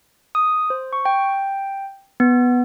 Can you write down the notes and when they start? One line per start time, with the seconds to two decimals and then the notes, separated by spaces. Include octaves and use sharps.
0.35 D#6
0.70 C5
0.93 C#6
1.05 G5
2.20 B3